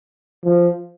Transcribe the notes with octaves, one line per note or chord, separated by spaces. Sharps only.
F3